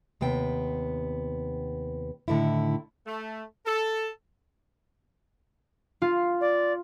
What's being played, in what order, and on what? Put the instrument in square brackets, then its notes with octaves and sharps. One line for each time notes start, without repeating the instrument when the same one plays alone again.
[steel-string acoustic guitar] D#2 C3 B3 G5
A2 D3 D#3 E4
[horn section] A3
A4
[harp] F4
[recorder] D5